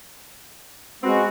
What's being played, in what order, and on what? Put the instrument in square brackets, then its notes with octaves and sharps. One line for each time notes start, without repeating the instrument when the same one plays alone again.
[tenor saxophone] G#3 [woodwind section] B3 F#4 [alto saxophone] C4